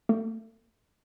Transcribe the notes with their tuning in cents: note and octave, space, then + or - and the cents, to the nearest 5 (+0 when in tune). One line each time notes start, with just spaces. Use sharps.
A3 +30